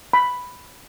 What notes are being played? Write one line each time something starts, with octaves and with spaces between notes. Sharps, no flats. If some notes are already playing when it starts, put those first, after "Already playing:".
B5